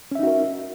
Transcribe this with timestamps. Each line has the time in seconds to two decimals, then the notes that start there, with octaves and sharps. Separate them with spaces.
0.11 C#4
0.15 E5
0.19 D#4
0.23 F#4
0.27 A#4